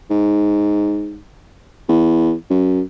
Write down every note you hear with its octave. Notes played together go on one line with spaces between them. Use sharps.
G#2
E2
F#2